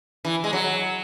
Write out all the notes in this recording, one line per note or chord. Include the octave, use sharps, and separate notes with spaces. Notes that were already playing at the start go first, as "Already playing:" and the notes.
E3
G#3
F#3